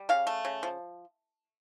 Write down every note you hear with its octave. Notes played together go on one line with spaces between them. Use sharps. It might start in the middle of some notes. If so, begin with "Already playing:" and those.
Already playing: G3
C#3 F5
A3
C#3
F3